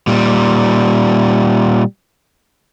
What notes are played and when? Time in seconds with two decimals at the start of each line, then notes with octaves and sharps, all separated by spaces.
0.07 A#2 G3